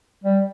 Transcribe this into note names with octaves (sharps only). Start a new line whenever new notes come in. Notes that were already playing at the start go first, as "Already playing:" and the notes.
G3